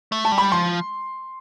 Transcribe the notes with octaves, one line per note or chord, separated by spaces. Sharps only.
A3
A5
G3
B5
F3 C6